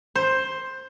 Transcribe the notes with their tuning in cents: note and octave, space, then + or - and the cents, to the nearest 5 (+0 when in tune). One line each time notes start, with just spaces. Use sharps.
C5 +10